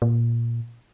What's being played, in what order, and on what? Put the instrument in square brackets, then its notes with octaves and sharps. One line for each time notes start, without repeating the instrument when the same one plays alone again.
[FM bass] A#2